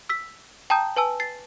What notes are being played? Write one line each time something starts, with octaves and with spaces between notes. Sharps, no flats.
E6 B6
G5 A5 A#5 D#6 G6
B4 G#5 A5 E6
A6 C7